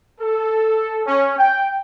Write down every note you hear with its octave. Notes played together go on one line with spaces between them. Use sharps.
A4
C#4
G5